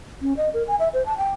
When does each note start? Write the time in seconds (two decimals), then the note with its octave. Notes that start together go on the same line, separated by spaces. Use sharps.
0.22 C#4
0.37 D#5
0.54 A#4
0.68 G#5
0.79 E5
0.93 C5
1.06 A5
1.18 G5